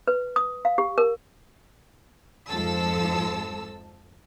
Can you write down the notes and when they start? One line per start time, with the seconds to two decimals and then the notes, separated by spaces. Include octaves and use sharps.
0.07 B4
0.36 D#6
0.65 F5
0.78 G4
0.98 A#4
2.48 F2 G#2 F3 A4 A5 E6